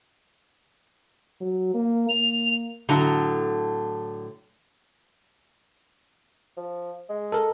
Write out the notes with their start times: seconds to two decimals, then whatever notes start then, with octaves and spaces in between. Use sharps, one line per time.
1.41 F#3
1.74 A#3
2.09 A#3 F7
2.89 A2 D3 F#3 A#5
6.57 F3
7.09 G#3
7.32 A4 A#4